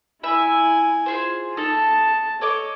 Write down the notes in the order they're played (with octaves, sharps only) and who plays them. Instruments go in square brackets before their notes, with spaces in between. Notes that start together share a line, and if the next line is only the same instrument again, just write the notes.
[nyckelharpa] E4 G#5 [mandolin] E5 B5
[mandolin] F4 G#4 C5
[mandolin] D#4 A4 [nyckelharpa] A5
[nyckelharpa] A4 [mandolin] C#5 D#5 D6